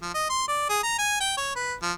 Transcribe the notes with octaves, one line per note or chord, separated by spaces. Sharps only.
F3
D#5
C6
D5
G#4
A#5
G#5
G5
C#5
B4
F3